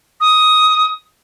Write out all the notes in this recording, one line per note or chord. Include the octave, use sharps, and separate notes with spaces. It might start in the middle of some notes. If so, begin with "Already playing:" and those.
D#6